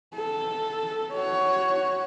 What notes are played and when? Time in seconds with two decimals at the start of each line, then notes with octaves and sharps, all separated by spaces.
0.15 A4
1.13 F#4 C#5